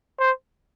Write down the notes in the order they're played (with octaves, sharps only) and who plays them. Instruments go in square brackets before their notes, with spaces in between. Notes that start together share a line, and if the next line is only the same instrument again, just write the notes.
[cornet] C5